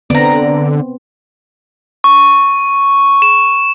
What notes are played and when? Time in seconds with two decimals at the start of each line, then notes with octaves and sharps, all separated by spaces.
0.10 D3 B3 C4 D5 A#5
2.04 C#6
3.22 E7